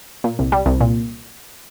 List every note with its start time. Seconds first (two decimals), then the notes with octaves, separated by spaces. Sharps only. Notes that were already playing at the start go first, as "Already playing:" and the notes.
0.24 A#2
0.39 C2
0.52 G3
0.66 C2
0.81 A#2